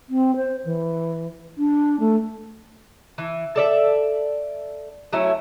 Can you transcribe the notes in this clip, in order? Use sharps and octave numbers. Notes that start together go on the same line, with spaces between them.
C4
C5
E3
D4
A3
E3
A4 D5 E5
F#3 A3 C#4 E4